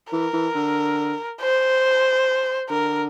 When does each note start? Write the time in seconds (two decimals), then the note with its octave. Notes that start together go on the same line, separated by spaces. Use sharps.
0.11 E3 A#4
0.33 E3
0.54 D3
1.41 C5
2.70 D3 A#4